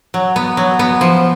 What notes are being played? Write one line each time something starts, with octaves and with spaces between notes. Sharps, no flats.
F#3
B3
F#3
B3
F3